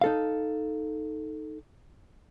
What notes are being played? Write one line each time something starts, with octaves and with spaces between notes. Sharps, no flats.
D#4 A4 F5